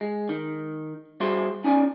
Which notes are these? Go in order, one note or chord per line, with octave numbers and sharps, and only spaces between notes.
G#3
D#3
G3 F#4 G#4 C5 E5 C6
C#4 D#4 D5 G#5